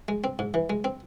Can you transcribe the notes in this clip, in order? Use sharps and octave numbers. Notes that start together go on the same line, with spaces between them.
G#3
C4
G#2
E3
G#3
C4